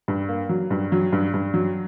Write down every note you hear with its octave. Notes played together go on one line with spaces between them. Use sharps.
G2
A#3
F#3
G2
F#3
G2
G2
F#3